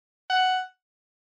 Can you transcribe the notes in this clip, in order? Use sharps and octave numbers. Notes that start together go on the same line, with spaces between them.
F#5